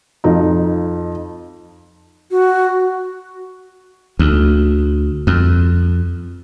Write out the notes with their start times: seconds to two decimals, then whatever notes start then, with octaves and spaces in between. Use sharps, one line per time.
0.24 F2 D#4
2.31 F#4
4.19 D2
5.27 F2